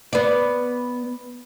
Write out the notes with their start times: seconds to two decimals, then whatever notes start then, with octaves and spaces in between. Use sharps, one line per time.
0.13 B3 D5